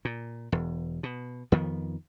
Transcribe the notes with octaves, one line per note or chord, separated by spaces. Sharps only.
A#2
E1 E2
B2
F2 D#3 F3 B3